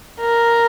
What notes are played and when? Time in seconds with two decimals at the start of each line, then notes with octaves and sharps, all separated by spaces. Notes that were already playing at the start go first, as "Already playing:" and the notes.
0.20 A#4